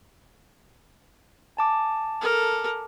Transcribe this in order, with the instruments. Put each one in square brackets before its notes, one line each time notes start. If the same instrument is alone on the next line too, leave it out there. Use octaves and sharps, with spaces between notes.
[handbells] G#5 A5 D6
[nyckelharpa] A4 A#4